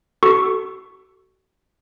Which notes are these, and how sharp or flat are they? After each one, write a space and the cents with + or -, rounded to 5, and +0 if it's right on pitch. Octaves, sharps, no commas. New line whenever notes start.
F#4 +35 A4 +0 C#6 +0